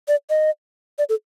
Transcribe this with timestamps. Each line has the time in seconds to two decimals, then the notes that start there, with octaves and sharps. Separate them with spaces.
0.08 D5
0.30 D#5
0.99 D5
1.09 A4